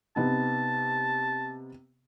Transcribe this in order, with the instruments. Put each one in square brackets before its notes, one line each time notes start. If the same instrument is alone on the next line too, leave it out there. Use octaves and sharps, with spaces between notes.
[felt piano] C3 B3 D#4 [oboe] A5